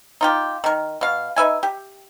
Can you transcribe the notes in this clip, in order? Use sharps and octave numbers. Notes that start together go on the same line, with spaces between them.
D#4 F4 G4
D#3 A#4
B2 F5
D#4 B4 E5 G#5
G4